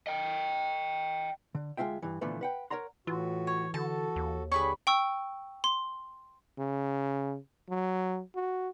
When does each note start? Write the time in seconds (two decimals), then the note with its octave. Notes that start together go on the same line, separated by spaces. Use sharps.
0.07 D#5 G5
1.55 D3
1.77 D2 G#3 C#4 F4 E5 G5
2.02 G2 E3
2.21 A#2 D3 E3 F3 A3 B3
2.41 B4 F#5 G5
2.70 A#4 C#5 F#5 A#5 C6
3.07 A2 E3 F4 F#4
3.47 C#5
3.74 D3 F#4 A4 A5
4.16 D#2
4.52 D3 G4 G#4 B4 C#5 B5 C#6
4.87 G5 C#6 E6
5.64 C6
6.58 C#3
7.69 F#3
8.35 F#4